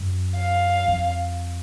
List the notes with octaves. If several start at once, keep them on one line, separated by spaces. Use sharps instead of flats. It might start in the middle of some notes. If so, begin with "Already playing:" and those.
Already playing: F#2
F5
F2